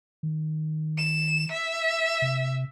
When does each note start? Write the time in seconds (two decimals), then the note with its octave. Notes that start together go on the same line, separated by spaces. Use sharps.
0.23 D#3
0.98 E7
1.52 E5
2.22 C3